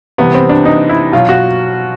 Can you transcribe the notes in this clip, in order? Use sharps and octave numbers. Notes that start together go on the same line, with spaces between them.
C3 E3 G3 B3
C4
D4
D#4
E4
B2 F#3 F4
F#4